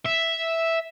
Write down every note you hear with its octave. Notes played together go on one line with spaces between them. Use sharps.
E5